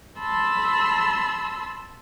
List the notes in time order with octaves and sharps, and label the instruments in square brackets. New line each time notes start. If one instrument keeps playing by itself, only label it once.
[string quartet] A5 B5 C6 E6